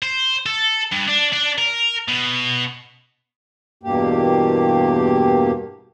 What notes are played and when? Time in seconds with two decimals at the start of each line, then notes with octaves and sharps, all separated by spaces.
0.02 C5
0.46 A4
0.92 G2
1.08 D4
1.33 D4
1.58 A#4
2.08 B2
3.83 E2 G2 B2 A#3 G4